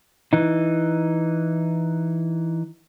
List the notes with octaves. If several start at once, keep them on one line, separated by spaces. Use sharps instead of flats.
E3 D#4